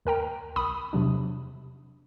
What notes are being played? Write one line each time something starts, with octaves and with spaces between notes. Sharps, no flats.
D#2 A#4 G5 A#5
C2 B5 D#6
E2 C3 F#3 D4